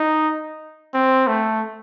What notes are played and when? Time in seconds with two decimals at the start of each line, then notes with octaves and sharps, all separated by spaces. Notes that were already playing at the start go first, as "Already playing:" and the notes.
Already playing: D#4
0.94 C4
1.27 A3